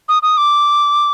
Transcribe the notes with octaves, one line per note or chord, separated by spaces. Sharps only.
D#6
D#6
D6